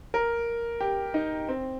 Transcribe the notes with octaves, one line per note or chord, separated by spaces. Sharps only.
A#4
G4
D#4
C4